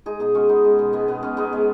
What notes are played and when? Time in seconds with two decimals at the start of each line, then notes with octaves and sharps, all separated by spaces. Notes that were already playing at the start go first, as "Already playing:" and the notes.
0.06 G#3 D#4 G#4
0.20 B2 D#4 G#4
0.35 G#3 C#4 F#4
0.49 G#3 B3 D#4
0.65 G#3
0.79 B2
0.93 G#3 B3
1.08 B2 B3
1.23 B2 C#4
1.37 G#3 B3 D#4
1.53 G#3